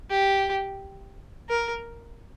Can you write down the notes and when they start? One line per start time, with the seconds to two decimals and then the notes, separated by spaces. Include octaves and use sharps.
0.10 G4
1.49 A#4